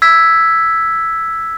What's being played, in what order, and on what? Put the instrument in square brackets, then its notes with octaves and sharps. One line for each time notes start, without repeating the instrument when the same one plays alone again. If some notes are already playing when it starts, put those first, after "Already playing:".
[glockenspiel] E6 G#6 B6